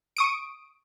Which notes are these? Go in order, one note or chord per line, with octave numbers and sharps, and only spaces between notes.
C#6 D#6 D7